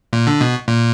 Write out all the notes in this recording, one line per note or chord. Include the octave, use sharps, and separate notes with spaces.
A#2
D3
B2
A#2